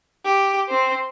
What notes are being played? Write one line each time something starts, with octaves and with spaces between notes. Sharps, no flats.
G4
C4 C5